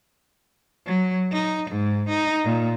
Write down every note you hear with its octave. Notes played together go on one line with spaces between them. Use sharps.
F#3
D#4
G#2
D#4
A#2